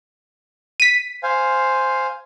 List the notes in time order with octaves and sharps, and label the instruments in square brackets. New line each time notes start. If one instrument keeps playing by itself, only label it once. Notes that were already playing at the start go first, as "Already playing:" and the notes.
[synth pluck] B6 D#7
[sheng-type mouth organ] C5 F5 G#5